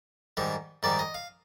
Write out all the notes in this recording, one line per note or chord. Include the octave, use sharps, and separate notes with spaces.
G#2 D#3 G3
G#2 D#3 G3 D5
D#5
F5